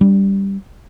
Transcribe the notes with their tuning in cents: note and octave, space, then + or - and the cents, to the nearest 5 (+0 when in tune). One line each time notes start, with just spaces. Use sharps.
G3 +0 D4 -30